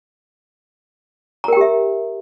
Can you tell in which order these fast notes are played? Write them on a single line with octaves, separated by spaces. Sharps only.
A#5 A#4 G5 G4 E5